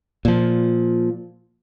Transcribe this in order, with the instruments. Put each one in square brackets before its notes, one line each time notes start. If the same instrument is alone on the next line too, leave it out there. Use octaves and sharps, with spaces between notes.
[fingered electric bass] A#2 F3